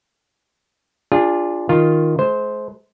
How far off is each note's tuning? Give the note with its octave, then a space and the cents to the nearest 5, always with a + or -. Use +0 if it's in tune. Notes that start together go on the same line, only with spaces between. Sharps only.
D4 +0 F4 +0 G#4 -30
D#3 +0 F4 +0
G#3 +45 C5 +0